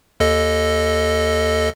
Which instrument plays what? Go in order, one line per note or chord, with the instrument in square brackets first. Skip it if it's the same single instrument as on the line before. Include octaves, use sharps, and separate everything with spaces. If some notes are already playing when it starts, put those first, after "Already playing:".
[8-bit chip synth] D#2 A4 D#5